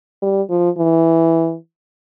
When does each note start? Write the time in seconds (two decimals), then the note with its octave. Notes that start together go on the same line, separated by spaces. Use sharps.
0.22 G3
0.50 F3
0.78 E3